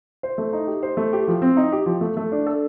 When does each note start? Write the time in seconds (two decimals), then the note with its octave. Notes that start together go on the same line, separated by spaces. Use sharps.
0.23 C5
0.38 A3
0.53 D#4
0.67 G4
0.83 C5
0.97 A3
1.13 G4
1.28 F3
1.42 C4
1.57 D#4
1.72 G4
1.86 F3
2.01 A3
2.17 A3
2.32 D4
2.47 A4